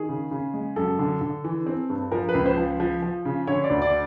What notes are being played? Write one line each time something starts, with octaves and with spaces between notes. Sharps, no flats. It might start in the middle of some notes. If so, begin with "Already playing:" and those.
Already playing: D#3 G#4
C#3
C#3
G#3
F#2 A4
D3
D3
E3
C4
G2
F3 A#4
B4
C#2
C5
F3
F3
F3
C#3
D3 C#5
D5
D2
D5